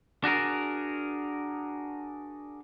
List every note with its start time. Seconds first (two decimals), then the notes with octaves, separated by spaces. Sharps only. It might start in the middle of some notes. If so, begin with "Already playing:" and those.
0.24 D4 F#4 G#4 A#4